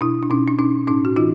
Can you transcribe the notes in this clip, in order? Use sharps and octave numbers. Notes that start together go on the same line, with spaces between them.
B2 D4 E4
D4
B2 C#4 D#4
D4
B2 C#4 D#4
A2 C#4 D#4
F#4
E3 D#4 F4